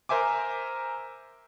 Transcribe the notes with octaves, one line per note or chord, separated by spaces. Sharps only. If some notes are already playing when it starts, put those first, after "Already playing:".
A#4 C5 E5 G#5 D6